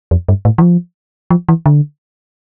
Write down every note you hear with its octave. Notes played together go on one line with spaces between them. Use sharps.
F2
G2
A2
E3
F3
F3
E3
D3